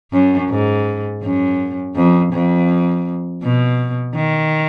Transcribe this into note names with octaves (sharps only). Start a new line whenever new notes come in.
F#2
G#2
F#2
F2
F2
B2
D#3